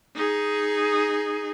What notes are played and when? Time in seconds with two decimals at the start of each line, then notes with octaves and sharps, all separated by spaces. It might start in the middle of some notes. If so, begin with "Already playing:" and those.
0.15 D#4 G#4